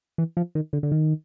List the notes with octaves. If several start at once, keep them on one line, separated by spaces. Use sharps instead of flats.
E3
F3
D#3
D3
D3
D#3